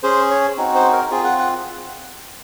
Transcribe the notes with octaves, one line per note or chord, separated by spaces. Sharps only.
C#4 G#4 C5
C#5
C4 D#4 F#4
C5
A#4
C4 F4 G#4
F#5
F#5